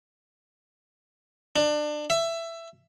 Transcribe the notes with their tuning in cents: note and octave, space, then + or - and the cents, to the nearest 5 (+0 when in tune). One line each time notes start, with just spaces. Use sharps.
D4 +25
E5 +15